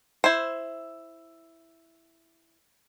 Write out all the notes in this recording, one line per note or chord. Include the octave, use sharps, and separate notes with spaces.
E4 C5